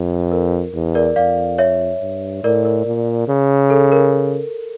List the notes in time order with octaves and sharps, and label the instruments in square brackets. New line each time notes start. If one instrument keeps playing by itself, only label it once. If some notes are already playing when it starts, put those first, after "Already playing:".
Already playing: [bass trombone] F2
[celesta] A#4
[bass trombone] E2
[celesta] A#4 D5
[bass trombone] F2 [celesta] D5 F5
[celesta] C#5 E5
[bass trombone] G2
[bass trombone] A2 [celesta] A#4 D5
[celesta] A#4
[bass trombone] A#2
C#3
[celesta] A4
A#4